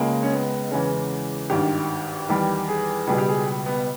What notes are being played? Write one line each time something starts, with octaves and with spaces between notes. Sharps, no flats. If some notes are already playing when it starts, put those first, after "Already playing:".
Already playing: C#2 C#3 G#3 A#3
C#4
B3
E2 C#3 E3 G#3 C#4
G#1 G2 D#3 G4
E2 D#3 G3
G#4
C#2 B2 G3 G#4
G4
G#4
B3